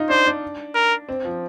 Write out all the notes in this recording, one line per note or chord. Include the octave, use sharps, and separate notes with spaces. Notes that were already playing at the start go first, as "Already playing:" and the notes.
Already playing: D#4 F4
D4 C5
D4
A#4
C4
F3